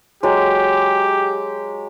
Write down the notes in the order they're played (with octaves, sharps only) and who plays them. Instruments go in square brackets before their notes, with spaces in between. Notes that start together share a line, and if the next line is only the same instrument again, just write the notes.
[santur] F#3 G#3 [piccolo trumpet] G4